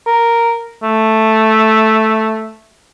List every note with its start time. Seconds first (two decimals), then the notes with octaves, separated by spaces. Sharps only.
0.07 A#4
0.83 A3